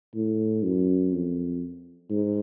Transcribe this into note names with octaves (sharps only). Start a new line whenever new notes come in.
A2
F#2
F2
G#2